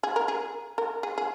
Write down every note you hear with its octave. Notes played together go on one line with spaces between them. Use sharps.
G#4
A#4
G#4
A#4
G#4
G#4